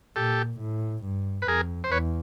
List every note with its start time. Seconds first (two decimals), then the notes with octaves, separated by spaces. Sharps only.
0.16 A#2 G4 A4
0.60 A2
1.04 G2
1.42 B4
1.47 F2 G#4 A#4
1.84 C5
1.91 E2 B4 C#5